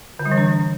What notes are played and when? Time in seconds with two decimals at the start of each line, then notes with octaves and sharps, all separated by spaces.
0.19 D3
0.25 G3
0.32 E3
0.38 D4